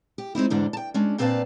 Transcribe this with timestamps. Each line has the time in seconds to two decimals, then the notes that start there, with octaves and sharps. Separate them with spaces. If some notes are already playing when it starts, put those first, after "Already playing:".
0.18 G4
0.35 G#3 C4 D#4 E4
0.50 E2 G#2 D3 D4
0.73 G5 A5
0.94 G#3 C#4 D4
1.18 A#2 C4 B4 D5 F5 A5